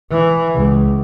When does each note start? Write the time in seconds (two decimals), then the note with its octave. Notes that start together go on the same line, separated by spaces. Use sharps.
0.10 E3
0.55 C#2